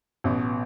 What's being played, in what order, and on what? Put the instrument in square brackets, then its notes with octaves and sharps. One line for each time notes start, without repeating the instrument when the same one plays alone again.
[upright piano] A1 [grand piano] B2